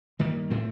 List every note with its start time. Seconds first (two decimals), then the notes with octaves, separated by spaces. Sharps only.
0.19 G2 D#3 G3 A#3
0.50 A2 A3 C4